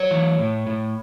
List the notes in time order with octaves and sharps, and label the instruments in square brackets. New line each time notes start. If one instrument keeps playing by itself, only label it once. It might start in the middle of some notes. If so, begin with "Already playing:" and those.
Already playing: [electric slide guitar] F#3 C#5
E3
A2
A2